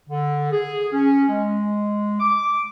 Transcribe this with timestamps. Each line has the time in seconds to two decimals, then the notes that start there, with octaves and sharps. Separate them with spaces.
0.09 D3
0.52 G#4
0.92 C#4
1.29 G#3
2.20 D6